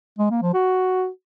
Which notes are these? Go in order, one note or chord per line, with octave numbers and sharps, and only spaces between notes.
G#3
A#3
F3
F#4